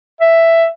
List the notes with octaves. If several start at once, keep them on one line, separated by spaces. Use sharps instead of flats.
E5